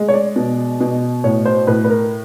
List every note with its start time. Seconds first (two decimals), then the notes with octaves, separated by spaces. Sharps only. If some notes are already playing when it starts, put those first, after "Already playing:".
Already playing: G#3
0.08 C#5
0.14 D5
0.36 B2
0.80 B2
1.24 A2 C#5
1.45 C5
1.67 A2 B4
1.84 B4
1.90 A#4